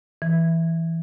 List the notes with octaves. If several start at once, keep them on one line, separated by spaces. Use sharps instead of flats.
E3